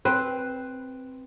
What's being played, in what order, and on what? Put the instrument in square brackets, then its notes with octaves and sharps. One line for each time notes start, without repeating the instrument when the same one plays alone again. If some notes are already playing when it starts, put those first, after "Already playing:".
[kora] C4 B4